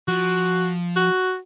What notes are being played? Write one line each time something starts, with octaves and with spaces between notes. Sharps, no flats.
F3 F#4
F#4